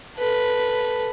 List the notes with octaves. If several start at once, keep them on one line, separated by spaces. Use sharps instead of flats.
A4 B4